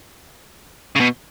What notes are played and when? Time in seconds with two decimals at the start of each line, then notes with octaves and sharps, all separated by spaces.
0.96 C#3
1.00 B2